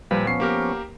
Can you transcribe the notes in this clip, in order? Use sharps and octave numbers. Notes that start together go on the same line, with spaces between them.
A#2 F3 G3 B4
F3 B3 C#4 C7
A#3 G4 A#4